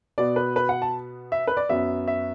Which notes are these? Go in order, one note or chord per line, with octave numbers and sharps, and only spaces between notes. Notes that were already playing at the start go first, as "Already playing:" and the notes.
B2 B3 D5
B4
B4
F#5
A5
E5
B4
D5
F#2 F#3 B3 E5
E5